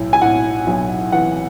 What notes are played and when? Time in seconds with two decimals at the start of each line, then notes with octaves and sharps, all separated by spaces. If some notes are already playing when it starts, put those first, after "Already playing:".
Already playing: B1 A2
0.13 G#5
0.21 A2 F#5
0.67 B1
1.12 E3 F#5